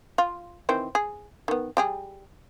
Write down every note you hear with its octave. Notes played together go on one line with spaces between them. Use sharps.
F4
D#3 E3 C4
G#4
D#3 B3
G3 G4 G#4